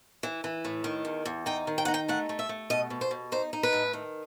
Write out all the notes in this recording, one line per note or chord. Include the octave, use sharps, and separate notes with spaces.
E3
E3
A2
D#3
E2
E2
D#4 G5
D#3
G5
D#4 F#5
G5
A3 F#5
A3
E5
A3
B2 D#5
B2
C5
B2
D#4 C5
D#4
B4
A2
D#3